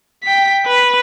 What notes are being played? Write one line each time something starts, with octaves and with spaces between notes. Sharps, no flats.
G5 B6
B4